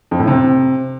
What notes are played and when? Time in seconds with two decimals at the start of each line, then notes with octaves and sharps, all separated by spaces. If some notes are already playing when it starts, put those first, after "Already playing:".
0.11 F2
0.19 A2
0.27 C3